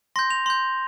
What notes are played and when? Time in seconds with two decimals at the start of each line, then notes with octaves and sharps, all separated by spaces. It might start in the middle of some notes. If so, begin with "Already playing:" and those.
0.16 C6 G6 A#6
0.30 F7
0.46 C6 G6